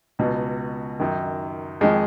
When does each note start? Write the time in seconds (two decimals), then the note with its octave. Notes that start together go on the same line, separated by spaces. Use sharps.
0.19 C#2 B2
1.00 F#2 D#3
1.81 F2 D#3 G#3